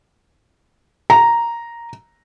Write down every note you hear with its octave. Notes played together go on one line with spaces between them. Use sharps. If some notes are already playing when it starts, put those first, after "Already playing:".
A#5